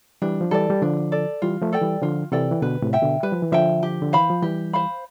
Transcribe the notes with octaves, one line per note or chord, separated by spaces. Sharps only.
E3 G3 D4
F3
E3 G3 A4 D5
G3
D3 F3 D4
A4 D5
E3 G3 F4
F3 A3
A4 D5 G5
E3 G3
D3 F3 F4
C3 E3 A4 D5 G5
E3
B2 D3 B4
A2 C3
E5 G5
B2 D3
G3 B4
F3
E3
D3 F3 E5 G5
G4
D3
E3 C5 F5 B5
F3
E3 G3 G4
C5 F5 B5